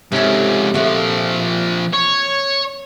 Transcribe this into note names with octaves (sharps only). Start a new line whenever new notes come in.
G#2 C3 C#4 A4
A#2 F3 A3 F#4
C#5